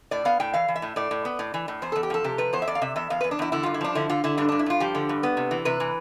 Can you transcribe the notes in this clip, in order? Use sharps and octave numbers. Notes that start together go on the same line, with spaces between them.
A2 D5
B3 F5
A2 G5
E3 F5
E3
E5
A2
A2 D5
A2
B3
A2
E3
A2
E2 C5
E2 A4
G4
F3 A4
C3 G4
F3 B4
E2 C5
E5
E2 D5
F5
C3 E5
E2 E5
E2 F5
E2 B4
D4
E2 E4
D3 E4
G2 F4
E4
F3 D4
D3 E4
D3 F4
D3 E4
G2 D4
G2 D4
E4
G2 F4
F3 G4
D3
G2
B3
C3
E3
C3 B4
E3